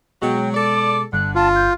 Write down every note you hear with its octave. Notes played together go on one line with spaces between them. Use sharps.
B2 F#3 G#3 G5
A4 D5 D6
G1 D3 F#6
F4 A5
G6